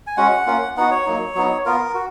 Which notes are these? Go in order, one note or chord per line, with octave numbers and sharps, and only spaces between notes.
G#5
G#3 C#4 F#4 F#5
A#3 C#4 F4
B3 D#4 F#4 F#5
C#5
F#3 A#3 D#4
F#3 B3 D#4
B3 F4 A#4
F#4